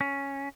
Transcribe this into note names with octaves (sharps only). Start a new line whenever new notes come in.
C#4